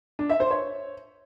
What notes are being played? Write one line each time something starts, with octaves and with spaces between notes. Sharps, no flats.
D4
E5
C5
C#5